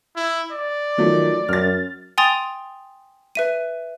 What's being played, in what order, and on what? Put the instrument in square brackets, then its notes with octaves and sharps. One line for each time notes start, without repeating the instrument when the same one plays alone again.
[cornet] E4
D5
[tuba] D#3 [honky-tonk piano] F3 F#3 A3
[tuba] F#2 [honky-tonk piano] F6 A6
[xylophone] G5 G#5 C6 D#6 A6 F7
B4 E5 D#7